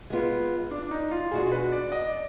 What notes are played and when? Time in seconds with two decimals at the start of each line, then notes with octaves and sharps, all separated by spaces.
0.10 G#3 B3 F4
0.71 D4
0.82 D4
0.91 D#4
1.11 F4
1.31 B2 G#3 D4 F#4 G#4
1.52 B4
1.72 D5
1.92 D#5
2.07 D5